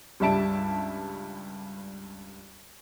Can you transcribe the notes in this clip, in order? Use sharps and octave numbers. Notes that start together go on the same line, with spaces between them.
C#2 G2 G3 E5 A5 D7